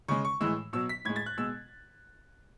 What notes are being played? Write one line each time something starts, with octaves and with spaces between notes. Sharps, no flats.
C#3 G#3 C#6
C#6
A2 E3 G#3 E6
B2 F#3 E6
B6
A2 G#3 G#6
A6
F#6
B2 G#3 E6